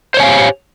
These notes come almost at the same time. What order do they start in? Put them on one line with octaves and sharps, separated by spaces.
C5 C#5 G#5 F5 G4